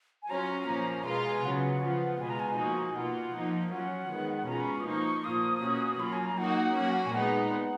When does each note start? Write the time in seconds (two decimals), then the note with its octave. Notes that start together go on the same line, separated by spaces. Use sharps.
0.23 G#5
0.30 F#3 C#4 F4 A#5
0.68 A#2 F3 A#3 C#4
1.06 B2 G#3 B3 F4 A#5
1.25 G#5
1.44 C#3 F#3 B3 F#5
1.82 F3 B3 F4
2.20 B2 G#3 B3 F4 G#5
2.30 A#5
2.40 G#5
2.58 F3 A#3 D#4 F#4
2.85 G#5
2.96 B2 A#3 F4 F#5
3.35 F3 A#3 D#4
3.72 F#3 C#4 F4 F#5
4.10 D#3 G#3 B3
4.48 B2 G#3 C#4 F4 A#5
4.60 B5
4.73 C#6
4.80 D#6
4.85 F3 A#3 D#4 C#6
5.24 A#2 F3 A#3 F4 D#6
5.62 B2 A#3 C#4 F#4
6.00 F#3 A#3 F4 B5
6.13 G#5
6.25 A#5
6.38 F#3 A#3 D#4 F#4 F#5
6.76 F#3 A#3 C#4 F#4
7.06 G#5
7.13 A#2 G#3 B3 D#4 F#5